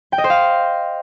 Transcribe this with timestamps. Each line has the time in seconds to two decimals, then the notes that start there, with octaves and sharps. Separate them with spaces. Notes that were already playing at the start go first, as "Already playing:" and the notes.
0.12 G5
0.18 D#5
0.24 C5
0.30 F5